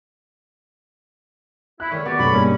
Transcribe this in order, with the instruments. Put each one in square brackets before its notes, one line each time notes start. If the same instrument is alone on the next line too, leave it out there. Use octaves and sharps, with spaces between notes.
[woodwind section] E4 [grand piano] F#6
[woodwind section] D3 D#3 C#5 [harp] G#3
[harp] B3 [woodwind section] F#4 G4 D5
[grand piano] F#2 A3 C#6 [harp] B2 [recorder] B5
[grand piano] G2 A#3 [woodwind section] C#3 C#4 [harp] D#4